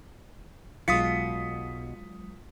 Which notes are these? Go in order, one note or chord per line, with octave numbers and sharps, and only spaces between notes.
B1 B2 F#3 G#3 F4 D#6 B6 C#7